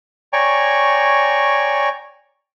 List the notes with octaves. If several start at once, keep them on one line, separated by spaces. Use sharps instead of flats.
C#5 D5 G5 G#5 A#5 C#6